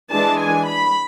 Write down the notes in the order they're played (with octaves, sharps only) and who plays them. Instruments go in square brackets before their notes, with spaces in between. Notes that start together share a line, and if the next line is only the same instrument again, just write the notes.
[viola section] E3 G#3 D4 A5
G#5
B5